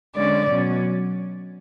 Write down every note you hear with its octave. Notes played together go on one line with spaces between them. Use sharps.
D3 G#3 C#4 D5
B2 F#3 C#4